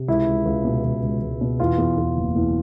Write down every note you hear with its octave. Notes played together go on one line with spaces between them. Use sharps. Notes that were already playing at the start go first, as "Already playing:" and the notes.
Already playing: C3
C#2 E4
C#2
C#2
B2
C#2
C#2
C#2
B2
E2 F4
E2
E2
F#1
E2